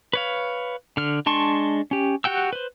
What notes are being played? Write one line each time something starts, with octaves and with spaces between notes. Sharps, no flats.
B4 C#5 F5
D3 F6
G#3 D4 A5 C6 C#6
C#4 G4
F#4 G4 F#5 G5 E6
B4 C5